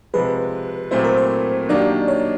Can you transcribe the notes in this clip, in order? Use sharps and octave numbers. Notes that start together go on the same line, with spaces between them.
C3 F3 G#3 B4
A#2 F#3 A3 C4 E4 C5
A#4
C5
D#3 F#3 A#3 D4 G4 D5
C#5